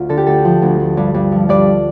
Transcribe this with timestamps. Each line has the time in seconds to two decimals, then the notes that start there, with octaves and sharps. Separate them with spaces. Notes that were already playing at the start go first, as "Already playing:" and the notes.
Already playing: D2 F4
0.09 D3 A4
0.17 G4
0.26 D2 A4
0.45 F3
0.62 D2
0.80 F3
0.97 G2
1.14 G2
1.32 F3
1.49 G2 D5